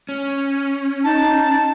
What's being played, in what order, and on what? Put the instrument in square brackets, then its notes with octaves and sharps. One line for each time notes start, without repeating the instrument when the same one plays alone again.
[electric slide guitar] C#4
[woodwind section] D#4 [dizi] A5